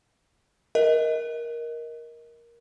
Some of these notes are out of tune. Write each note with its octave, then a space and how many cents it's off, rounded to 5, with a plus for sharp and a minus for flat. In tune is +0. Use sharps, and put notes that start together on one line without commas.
A#4 +10 D#5 +20